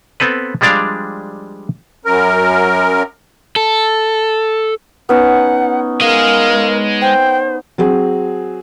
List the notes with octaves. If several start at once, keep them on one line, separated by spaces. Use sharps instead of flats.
B3 C4 A4 B4
F3 G3 G#3 D4 D5 F5
F#2 A#4
A4
B3 C#4 D#4 F#5
G#3 G#4 A#4 F5
C5 G5
F#3 C4 G#4